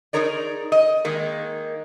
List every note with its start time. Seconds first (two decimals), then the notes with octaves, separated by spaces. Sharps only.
0.13 D#4 E4 G#4 A#4 C#5 D5
0.72 D#5
1.05 D#3 G#3 A#3